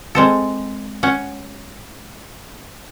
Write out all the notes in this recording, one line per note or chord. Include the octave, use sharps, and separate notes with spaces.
G#3 C4 A4
C#4 F#5